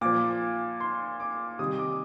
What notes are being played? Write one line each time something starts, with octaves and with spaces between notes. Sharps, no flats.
A#2 F3 D6
C6
D6
C3 D#3 G3 D#6
D6